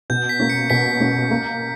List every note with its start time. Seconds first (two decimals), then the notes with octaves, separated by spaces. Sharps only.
0.10 B2 G6
0.29 B6
0.40 A#3 C#4
0.50 C#7
0.70 B2 B6
1.00 A#3 C#4
1.31 A#3